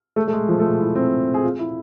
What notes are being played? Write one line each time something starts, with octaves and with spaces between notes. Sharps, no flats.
A3
A3
G#3
F3
A3
G#3
E4
C4
G#4
F4
E4